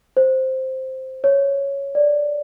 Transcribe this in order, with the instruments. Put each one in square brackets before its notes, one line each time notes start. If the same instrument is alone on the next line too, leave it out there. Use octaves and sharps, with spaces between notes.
[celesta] C5
C#5
D5